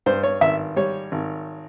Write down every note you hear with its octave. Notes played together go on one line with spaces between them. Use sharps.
G2 C5
C#5
G#1 E5
G3 C#5
G#1